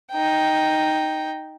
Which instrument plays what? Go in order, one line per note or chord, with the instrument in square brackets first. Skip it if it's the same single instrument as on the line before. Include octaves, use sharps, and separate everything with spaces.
[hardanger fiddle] D#4 G5